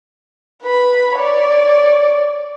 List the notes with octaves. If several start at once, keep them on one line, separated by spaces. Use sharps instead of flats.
B4 B5
C#5 D5